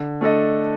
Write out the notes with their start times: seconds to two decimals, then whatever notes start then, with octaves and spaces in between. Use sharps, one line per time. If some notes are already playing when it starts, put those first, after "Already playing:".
Already playing: D3
0.21 A3 D4 A4 D#5